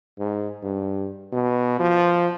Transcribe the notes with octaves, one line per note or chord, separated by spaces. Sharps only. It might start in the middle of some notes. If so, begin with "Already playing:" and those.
G#2
G2
B2
F3